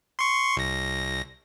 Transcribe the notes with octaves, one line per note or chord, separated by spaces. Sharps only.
C6 C#6
C2 A#6